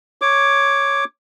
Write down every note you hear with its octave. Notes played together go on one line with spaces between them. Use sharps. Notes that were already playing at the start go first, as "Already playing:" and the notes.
C#5 D6